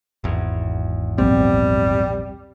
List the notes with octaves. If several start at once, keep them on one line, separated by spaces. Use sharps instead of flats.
G#1 E2
A#1 G3 B3 C4